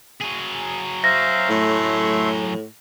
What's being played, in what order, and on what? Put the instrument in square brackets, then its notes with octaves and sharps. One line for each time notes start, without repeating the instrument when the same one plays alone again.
[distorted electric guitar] F#3 G#4
[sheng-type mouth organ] C5 E5 F5 [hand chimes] A#6
[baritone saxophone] A2 [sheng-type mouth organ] A3 E5 C6